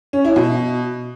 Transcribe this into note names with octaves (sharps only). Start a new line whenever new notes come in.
C#4
E4
B2